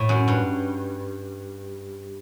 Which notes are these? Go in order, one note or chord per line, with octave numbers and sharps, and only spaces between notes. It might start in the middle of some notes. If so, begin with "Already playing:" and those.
Already playing: A2
F#2
G2